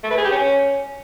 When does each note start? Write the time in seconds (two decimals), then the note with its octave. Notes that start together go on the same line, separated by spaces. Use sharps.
0.04 A3
0.11 B4
0.18 G#4
0.25 G4
0.32 C#4